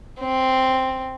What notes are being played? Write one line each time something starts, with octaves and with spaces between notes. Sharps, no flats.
C4